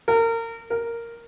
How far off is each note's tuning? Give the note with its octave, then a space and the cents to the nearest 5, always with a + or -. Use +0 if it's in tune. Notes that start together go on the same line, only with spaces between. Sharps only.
A#4 -30
A#4 -5